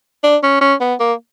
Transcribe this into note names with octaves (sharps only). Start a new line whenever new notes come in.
D4
C#4
C#4
B3
A#3